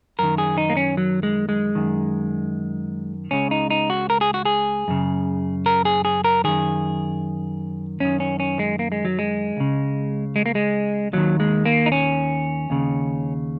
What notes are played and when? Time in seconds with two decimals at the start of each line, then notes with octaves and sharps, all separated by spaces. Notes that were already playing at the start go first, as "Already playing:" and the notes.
0.19 F#2 D#3 A#4
0.38 G#4
0.58 D#4
0.69 A#3
0.77 C#4
0.97 F#3
1.23 G#3
1.49 G#3
1.75 F#2 D#3
3.31 C#2 C#3 C#4
3.51 D#4
3.70 D#4
3.90 F#4
4.10 A#4
4.21 G#4
4.34 F#4
4.45 G#4
4.88 F#2 C#3
5.66 A#4
5.85 G#4
6.05 G#4
6.24 A#4
6.44 F#2 D#3 G#4
8.00 F#2 D#3 C#4
8.20 C#4
8.40 C#4
8.59 G#3
8.79 A#3
8.92 G#3
9.05 F#3
9.19 G#3
9.57 C#2 C#3
10.36 G#3
10.46 A#3
10.55 G#3
11.13 D#2 D#3 F#3
11.40 G#3
11.66 A#3
11.86 D#4
11.92 C#4
12.70 D#2 C#3